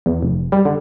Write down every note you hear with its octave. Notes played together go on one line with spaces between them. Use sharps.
E2
F1
G3
D3